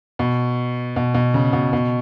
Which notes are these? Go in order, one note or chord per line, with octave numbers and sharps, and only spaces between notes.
B2
B2
B2
C#3
B2
B2